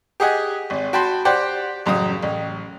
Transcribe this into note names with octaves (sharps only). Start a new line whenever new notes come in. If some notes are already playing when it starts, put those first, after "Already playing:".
G4 G#4 D#5 F#5 G#5
G#1
F#4 G5 A5 B5 C6
G4 C5 D5 F#5 G5
A1 F#2 C#3 D#6
A1